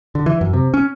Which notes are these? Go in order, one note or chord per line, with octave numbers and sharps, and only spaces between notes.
D3
E3
F#2
C3
C#4